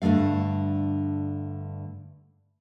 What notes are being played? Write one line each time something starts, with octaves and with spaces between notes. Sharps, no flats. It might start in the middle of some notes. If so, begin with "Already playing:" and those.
G2 D3 G#3 A3 F5